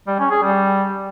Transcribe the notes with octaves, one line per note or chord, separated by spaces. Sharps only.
G3
C#4
G#4
G3